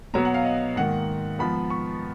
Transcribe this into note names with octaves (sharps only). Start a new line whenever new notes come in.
B2 F#3 B3 A#5
F#5
F5
D#5
G#2 D#3 A#3 F#5
G#2 F3 B3 B5
C#6